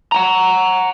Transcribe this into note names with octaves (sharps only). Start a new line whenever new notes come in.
F#5 G5 A#5